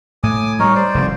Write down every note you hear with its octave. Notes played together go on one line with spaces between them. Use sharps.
A2 G#5 D6 D#6
F#3 G3 D#4 A#4 C#5
C5 D5
F1 C2 D#3